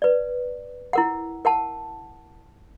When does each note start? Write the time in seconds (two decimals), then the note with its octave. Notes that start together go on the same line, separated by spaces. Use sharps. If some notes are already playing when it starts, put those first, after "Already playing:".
0.02 B4 D5
0.93 E4 A#4 F#5
1.45 A#4 F#5 A5